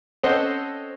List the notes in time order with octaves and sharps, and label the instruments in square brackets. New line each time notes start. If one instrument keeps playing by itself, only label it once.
[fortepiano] C4 C#4 A4 C5 D#5 F#5